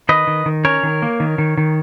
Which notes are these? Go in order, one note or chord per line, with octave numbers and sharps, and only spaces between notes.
D#3 B4 D#5
D#3
D#3
C#4 A#4 C#5
D#3
A#3
D#3
D#3
D#3